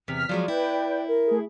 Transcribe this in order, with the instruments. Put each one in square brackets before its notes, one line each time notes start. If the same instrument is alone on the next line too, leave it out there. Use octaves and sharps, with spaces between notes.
[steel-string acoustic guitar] E2 C3 [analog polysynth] F6 B6
[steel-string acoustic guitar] F3 F#3 G#3 [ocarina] D5
[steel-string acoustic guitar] E4 [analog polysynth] B4 G5
[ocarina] A#4
[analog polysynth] A3 G#4